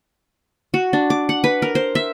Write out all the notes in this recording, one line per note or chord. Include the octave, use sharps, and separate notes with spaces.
F#4
D4
D6
F#5
B4
A#4
C5
E5